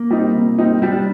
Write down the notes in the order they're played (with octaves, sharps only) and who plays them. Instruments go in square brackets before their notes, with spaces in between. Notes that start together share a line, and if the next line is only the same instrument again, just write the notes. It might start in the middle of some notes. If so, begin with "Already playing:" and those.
Already playing: [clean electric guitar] A#3
[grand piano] G3 C4 D#4
C3
G3 C4 D#4
[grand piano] G3 [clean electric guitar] C4
[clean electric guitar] D4